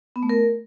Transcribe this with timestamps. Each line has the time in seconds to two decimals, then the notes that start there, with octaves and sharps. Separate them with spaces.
0.16 B3
0.23 A3
0.30 A#4